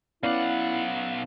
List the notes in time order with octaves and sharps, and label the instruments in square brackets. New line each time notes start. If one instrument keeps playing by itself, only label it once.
[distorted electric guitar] B1 F#5 [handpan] B3 C#4 D5 [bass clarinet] E4 [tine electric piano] F5